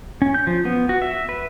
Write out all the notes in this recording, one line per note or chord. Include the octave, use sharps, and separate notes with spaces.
C#4
G6
F3
B3
F#4
E5
B4